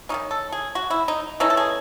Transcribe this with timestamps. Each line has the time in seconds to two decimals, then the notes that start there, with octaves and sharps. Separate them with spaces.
0.09 D#3 G#3 C#4 D#4
0.31 A4
0.52 G#4
0.75 F#4
0.90 E4
1.08 D#4
1.40 E3 A3 C#4 D#4
1.50 A4
1.57 G#4